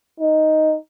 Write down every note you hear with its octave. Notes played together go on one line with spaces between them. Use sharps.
D#4